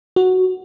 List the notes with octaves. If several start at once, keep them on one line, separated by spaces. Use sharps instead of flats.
F#4